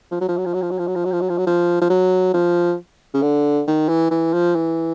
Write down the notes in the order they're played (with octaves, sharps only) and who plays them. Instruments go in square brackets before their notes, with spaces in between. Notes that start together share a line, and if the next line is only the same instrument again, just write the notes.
[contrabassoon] F3
F#3
F3
F#3
F3
F#3
F3
F#3
F3
F#3
F3
F#3
F3
F#3
F3
F#3
F3
F3
F#3
F3
C#3
D3
D#3
E3
E3
F3
E3